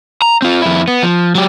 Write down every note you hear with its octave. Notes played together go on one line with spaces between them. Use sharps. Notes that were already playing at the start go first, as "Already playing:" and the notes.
A#5
C4 F4
F2 E4
B3
F3
F#3 G4